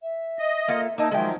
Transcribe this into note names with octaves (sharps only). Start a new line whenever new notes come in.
E5
D#5
A#3 F4 A4
A#3 D#4 D#5 E5 A5
D#3 F3 F#3 G#3 E5 G5